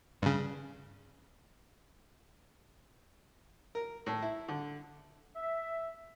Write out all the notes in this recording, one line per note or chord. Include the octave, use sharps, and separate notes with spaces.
G2 C#3
A#4
A2
E4
D3
E5